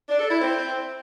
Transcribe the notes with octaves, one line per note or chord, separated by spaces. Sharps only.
D4
A4
E4
C4